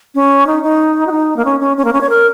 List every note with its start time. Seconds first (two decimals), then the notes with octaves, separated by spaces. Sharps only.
0.15 C#4
0.47 D#4
0.63 D#4
1.07 F#4
1.11 D#4
1.36 A#3
1.45 C#4
1.60 C#4
1.77 C#4
1.85 A#3
1.93 C#4
2.01 C#5
2.09 A#4